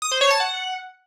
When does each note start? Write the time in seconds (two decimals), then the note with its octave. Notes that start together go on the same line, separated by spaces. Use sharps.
0.02 D#6
0.11 C5
0.21 C#5
0.30 A5
0.40 F#5